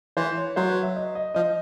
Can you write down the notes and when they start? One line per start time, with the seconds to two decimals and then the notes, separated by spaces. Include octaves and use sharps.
0.17 E3 C5
0.37 C#5
0.56 F#3 C5
0.69 B4
0.83 E5
0.96 D#5
1.15 D#5
1.35 F3 D#5